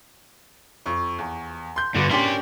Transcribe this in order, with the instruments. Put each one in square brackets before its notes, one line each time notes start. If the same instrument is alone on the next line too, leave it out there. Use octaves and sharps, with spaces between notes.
[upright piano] F2 C#6
E2
C6 G6
[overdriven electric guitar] G2 D3 [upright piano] B3 F#4
[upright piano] C#4 D4 G4 [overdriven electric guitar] A#4 C6